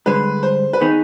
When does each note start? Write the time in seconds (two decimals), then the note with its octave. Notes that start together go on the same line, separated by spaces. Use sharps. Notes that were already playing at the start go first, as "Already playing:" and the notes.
0.06 G2 D3 G#3 B4
0.43 C5
0.73 B4
0.80 D#3 B3 D#4 G#4